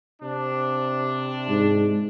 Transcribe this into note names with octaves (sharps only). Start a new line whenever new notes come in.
C3 D4
G#2